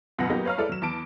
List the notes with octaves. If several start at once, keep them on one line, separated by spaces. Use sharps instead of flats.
C#2 F#2 B2 B4 F#5 A#6
F#3 A#3 B3 D#4 G4
B4 C#5 F5 A#5 F6
G#3 E4 A4 B4 D5
F#3 E7
E2 A5 D7